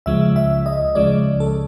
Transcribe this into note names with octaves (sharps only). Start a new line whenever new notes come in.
C#2 C#3 F3 G#3 E5
E5
D#5
C#2 C#3 F3 G#3 D5
A4